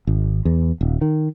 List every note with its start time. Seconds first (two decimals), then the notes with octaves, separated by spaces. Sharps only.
0.07 G#1
0.45 E2
0.81 D#1
1.01 D#3